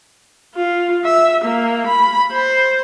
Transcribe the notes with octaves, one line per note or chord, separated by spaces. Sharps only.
F4
E5
A#3
B5
C5